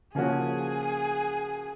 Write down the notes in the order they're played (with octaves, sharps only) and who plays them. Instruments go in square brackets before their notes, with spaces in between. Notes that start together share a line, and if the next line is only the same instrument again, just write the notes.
[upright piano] C#3 F3 A#3 C#4 F#4 [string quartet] G#4